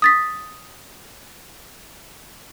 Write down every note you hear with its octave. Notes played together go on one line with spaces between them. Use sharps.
D#6 A6 B6